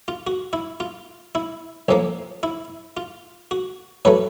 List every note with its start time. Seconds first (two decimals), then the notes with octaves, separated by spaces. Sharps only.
0.08 F4
0.27 F#4
0.53 E4
0.80 F4
1.35 E4
1.88 A1 A2 F3 A#3
2.43 E4
2.97 F4
3.51 F#4
4.05 A2 F#3 A3 B4